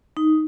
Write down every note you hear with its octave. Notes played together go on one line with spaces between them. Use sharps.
D#4